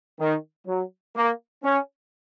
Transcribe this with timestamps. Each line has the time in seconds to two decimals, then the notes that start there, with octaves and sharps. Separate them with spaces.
0.20 D#3
0.67 F#3
1.16 A#3
1.64 C#4